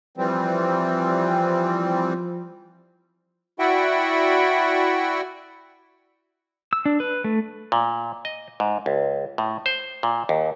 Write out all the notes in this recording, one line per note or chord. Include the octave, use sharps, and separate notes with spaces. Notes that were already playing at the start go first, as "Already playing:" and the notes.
E3 F3 G3 C4
E4 F#4 D5 E5 F#5 G5
E6
D4
B4
A3
A#2
D#5
G#2
C#2
A2
C5
A#2
D#2